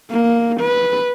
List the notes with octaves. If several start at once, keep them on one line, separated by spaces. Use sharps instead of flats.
A#3
B4